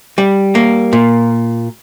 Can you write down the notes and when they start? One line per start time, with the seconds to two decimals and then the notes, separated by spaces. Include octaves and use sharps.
0.18 G3
0.55 A#3
0.93 A#2